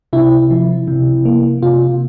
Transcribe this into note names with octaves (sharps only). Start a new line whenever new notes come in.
C3 E4
F3
C3
A#3
C3 F4